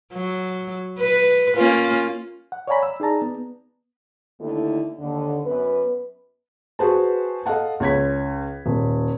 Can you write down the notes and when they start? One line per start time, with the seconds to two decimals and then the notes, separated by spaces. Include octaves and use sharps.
0.13 F#3
1.00 B4
1.56 A#3 C#4 F4
2.52 F#5
2.68 C#5 D5 F5 G#5 A#5 B5
2.83 E6
3.00 D#4 G#4 D5 A5 A#5
3.22 B3
4.41 D#2 D3 A3 D#4 E4
5.00 D#2 D3
5.46 F#2 B3 B4
6.79 F#4 G#4 B4 C5 A5
7.46 A4 D#5 F5 F#5 A5
7.80 C#2 C#5 G#6 B6
8.66 D#1